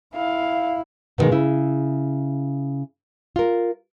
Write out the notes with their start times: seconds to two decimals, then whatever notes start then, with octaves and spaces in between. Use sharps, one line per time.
0.15 E4 F5
1.18 B2 D3 D#3 G#3 A#3
1.32 C#3 E4
3.36 F4 A#4